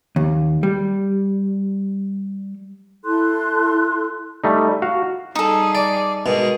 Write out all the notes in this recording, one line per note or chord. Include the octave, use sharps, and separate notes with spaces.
D#2
G3
E4 A4 C6 F#6
G3 A3 D#4
F#4 F5
G3 D#4 G#4 A4 D#6
D5 D6
B2 G#3 G#4 A#4